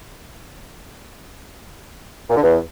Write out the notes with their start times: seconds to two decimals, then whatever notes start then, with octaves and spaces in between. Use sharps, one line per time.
2.30 A#2
2.36 D3
2.43 E2